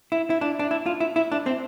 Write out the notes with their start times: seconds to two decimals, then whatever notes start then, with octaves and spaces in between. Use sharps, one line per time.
0.12 E4
0.30 E4
0.41 D4
0.59 D4
0.71 E4
0.86 F4
1.00 E4
1.16 E4
1.32 D4
1.46 C4